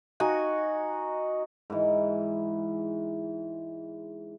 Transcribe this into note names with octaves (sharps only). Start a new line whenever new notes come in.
D#4 F#4 G#5
G#2 E3